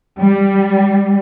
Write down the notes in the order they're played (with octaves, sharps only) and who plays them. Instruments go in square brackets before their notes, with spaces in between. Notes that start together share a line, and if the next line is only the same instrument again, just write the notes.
[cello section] G3